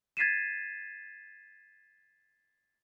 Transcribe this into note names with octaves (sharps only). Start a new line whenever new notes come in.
G#6 A6 B6 C7 D#7 E7